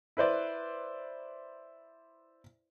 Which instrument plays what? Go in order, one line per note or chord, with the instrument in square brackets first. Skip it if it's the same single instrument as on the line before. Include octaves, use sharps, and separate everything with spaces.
[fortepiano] E4 B4 C5 D5